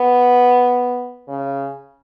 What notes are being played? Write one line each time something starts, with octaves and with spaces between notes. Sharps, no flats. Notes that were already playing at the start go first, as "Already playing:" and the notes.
Already playing: B3
C#3